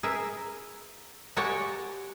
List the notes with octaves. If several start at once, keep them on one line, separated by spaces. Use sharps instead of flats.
G#4 A#4 B4 E5
G#3 F#4 G4 C#5 D5 F#5